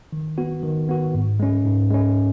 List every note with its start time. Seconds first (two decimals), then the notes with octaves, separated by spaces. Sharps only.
0.12 D#3
0.38 B3 F#4
0.63 D#3
0.89 B3 F#4
1.14 G#2
1.40 G#3 C#4
1.65 G#2
1.91 G#3 C#4